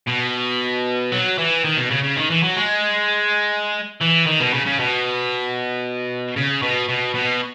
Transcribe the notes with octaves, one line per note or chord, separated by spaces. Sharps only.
B2
F#3
E3
D#3
B2
C#3
C#3
D#3
E3
F#3
G#3
E3
D#3
B2
C#3
C#3
B2
C#3
B2
B2
B2